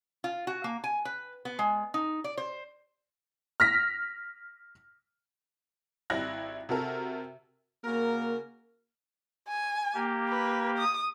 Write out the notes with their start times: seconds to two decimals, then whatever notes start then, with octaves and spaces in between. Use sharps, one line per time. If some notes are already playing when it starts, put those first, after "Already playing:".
0.24 F4
0.47 F#4
0.64 A#3
0.84 G#5
1.05 B4
1.45 B3
1.59 G#3
1.94 D#4
2.24 D5
2.37 C5
3.60 F6 A#6 B6
6.10 G#1 G3 E4 F#6 A#6
6.69 C3 F#4 A4 A#4
7.84 C#3 A#3 F#4 A#4
9.48 G#5
9.94 A#3 G4
10.29 B4
10.78 D#6